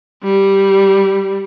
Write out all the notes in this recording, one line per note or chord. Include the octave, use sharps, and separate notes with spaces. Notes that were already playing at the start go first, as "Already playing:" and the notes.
G3